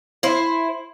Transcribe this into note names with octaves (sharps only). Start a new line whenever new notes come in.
E4 C5